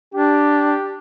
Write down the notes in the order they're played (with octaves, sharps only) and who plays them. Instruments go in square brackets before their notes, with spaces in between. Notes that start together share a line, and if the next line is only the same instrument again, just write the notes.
[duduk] D4 [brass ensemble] G4